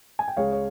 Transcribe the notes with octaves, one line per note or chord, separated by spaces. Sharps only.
G#5
G5
C#2 C#3 G#3 C#5 F5
C#5